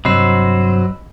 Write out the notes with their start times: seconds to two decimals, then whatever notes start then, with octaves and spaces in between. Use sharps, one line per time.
0.05 G2 C3 F#3 C5 D#5 B5 E6